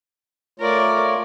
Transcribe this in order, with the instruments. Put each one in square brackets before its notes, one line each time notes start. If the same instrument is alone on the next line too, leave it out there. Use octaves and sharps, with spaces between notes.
[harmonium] A3 F4 C#5 [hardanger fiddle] A#4 D5